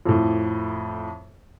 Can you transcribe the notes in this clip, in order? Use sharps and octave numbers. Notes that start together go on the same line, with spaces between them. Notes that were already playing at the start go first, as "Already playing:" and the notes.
F2 A2